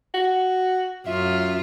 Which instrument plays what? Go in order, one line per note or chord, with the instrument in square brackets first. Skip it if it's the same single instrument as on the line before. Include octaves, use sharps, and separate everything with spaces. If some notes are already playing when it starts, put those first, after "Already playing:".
[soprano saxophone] F#4
[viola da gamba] F#2 F4 [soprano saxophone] E5